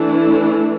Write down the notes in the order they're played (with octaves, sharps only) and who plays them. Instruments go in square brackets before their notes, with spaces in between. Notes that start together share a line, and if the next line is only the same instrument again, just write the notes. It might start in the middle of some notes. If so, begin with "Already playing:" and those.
Already playing: [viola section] E3 A3 D4